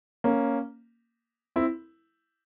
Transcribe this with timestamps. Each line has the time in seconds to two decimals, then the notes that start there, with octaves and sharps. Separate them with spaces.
0.24 A#3 C#4
1.56 C4 E4